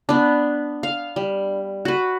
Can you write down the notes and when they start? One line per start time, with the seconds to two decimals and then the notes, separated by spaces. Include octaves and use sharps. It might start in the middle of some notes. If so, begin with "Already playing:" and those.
0.09 B3 D4
0.83 F5
1.16 G3
1.85 F#4 B4